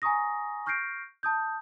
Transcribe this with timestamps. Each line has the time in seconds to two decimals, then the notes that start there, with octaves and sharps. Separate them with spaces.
0.02 G#5 A#5 C#6 D#6 A#6
0.66 C#6 F6 G6 A#6 C7 D7
1.23 A5 D#6 G6